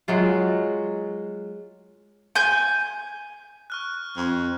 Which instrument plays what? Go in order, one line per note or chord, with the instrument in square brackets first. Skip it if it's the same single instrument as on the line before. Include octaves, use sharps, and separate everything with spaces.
[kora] F#3 G#3 F4
[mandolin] G#5 G6
[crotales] C#6 F6 F#6
[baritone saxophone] F2